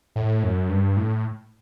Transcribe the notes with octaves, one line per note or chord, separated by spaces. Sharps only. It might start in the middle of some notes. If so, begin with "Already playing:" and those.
A2
F#2
G2
A2